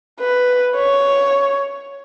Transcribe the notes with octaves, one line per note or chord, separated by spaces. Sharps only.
B4
C#5